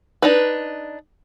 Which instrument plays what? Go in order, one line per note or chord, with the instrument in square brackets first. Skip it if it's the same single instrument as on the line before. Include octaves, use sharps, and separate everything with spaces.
[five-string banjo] D4 D#4 B4